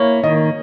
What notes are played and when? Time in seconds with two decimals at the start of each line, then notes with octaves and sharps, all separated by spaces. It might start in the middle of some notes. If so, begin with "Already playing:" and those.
Already playing: A#3 E4 C#5
0.24 D#3 D#5